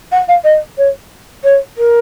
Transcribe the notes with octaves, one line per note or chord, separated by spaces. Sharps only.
F#5
F5
D#5
C#5
C#5
A#4